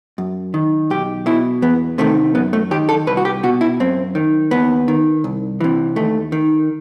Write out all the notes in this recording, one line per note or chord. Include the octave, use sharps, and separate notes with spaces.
F#2
D#3
B1 G4
B2 E4
E2 B3
C3 D#3 A3
F#2 B3
A3
D#3 G4
A4
C2 B4
F#4
G4
B2 F#4
E4
F#2 C4
D#3
D#2 B3
D#3
C2
C3 E3
D#2 A3
D#3